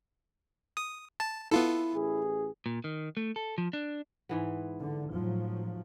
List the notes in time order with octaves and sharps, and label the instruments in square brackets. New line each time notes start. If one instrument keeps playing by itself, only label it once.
[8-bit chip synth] D#6
A5
[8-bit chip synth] B3 F4 A4 [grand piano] E4
[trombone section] A1 G#4
[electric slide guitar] A#2
D#3
A3
A4
F3
D4
[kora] G#2 E3 B3
[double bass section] D3
A2 F3 F#3